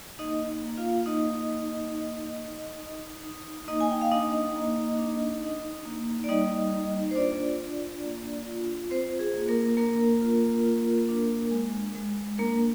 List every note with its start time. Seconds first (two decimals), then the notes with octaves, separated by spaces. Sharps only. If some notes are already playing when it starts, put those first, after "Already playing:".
0.19 A#3 D#4 D#5
0.64 A#3
0.77 F4 F5
1.06 A#3 D#4 D#5
1.50 A#3
1.94 D#4
2.37 D#4
2.81 D#4
3.24 D#4
3.68 A#3 D#4 D#5
3.81 G#5
3.90 G5
4.02 F5
4.11 D4 D#4 D#5
4.56 A#3
4.99 D4
5.42 D#4
5.85 A#3
6.24 D5
6.29 G3 D#4 D#5
6.72 A#3
7.11 C5
7.16 D4 F4 D5
7.60 F4
8.03 A#3
8.46 F4
8.90 C4 F4 C5
9.19 G#4
9.34 A#3
9.48 A#3 A#4
9.77 A#3 D4 A#4
10.21 F4
10.65 F4
11.09 D4
11.51 G#3
11.95 G#3
12.38 A#3 D4 A#4